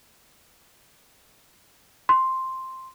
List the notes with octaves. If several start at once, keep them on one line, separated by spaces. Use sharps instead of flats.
C6